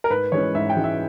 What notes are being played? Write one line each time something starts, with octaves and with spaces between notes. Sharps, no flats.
A#4
G#2 B4
E3 G#3 C#4 C#5
G#2 E5
G5
E3 G#3 C#4
E5